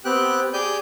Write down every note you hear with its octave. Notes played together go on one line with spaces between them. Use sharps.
B3 C4 G4 G5 F#6
G4 G#4 D5 G#5 G6